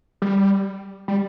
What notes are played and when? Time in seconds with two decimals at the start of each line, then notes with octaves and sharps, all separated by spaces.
0.22 G3
1.08 G3